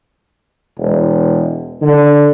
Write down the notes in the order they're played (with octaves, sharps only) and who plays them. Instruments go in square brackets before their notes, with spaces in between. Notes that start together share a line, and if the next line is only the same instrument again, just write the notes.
[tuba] E1
D3